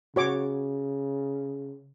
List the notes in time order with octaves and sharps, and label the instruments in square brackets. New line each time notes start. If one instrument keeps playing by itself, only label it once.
[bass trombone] C#3 [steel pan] F#4 C#5 D6